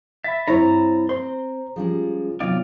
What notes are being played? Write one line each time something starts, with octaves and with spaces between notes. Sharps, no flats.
E5 B5 A6
G2 C4 E4 C5 C#5 A#5
C4 C5 C6
F3 G3 G#3 C#4 F4 G#4
C3 D#3 F#3 B3 F4 D5